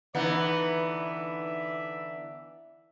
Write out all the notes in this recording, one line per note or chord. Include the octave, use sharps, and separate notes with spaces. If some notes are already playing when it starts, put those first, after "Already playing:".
D3 E3 B3 D#4 D5 E5